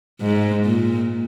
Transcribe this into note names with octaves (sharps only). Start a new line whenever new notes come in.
G#2
A#2